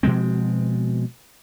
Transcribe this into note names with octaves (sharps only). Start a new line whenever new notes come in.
B2 F3 G#3 C4